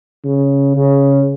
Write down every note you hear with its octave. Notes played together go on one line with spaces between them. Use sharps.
C#3
C#3